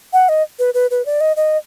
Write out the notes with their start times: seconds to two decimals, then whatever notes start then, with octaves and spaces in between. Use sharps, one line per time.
0.13 F#5
0.29 D#5
0.59 B4
0.74 B4
0.91 B4
1.06 D5
1.21 D#5
1.36 D#5